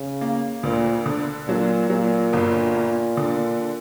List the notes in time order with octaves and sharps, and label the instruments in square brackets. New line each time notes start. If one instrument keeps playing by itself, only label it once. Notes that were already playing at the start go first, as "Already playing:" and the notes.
Already playing: [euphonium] C#3
[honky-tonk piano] A#3
[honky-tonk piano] D2 [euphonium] A#2
[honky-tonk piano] D3
[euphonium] A#2 [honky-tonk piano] F#3
[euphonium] A#2 [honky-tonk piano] F#3
[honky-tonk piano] G1
A#3
D3